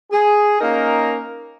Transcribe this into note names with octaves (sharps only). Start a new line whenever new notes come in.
G#4
A#3 C#4 D#4 A#4